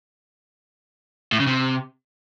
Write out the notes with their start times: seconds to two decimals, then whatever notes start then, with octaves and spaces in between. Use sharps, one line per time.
1.32 A2
1.40 C#3
1.47 C3